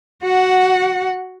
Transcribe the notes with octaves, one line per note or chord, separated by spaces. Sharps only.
F#4 F#5